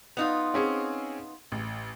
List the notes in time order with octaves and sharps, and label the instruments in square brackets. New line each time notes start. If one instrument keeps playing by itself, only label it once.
[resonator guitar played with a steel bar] B3 D#4 F4 [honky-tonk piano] F7
[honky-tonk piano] C4 C#4 G#4
A1